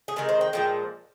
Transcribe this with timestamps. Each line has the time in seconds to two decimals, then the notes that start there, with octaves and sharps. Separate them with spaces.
0.08 G#4
0.16 C3 D#3 G#3 A#4
0.29 C5
0.41 G5
0.53 A#2 F3 G#3 G5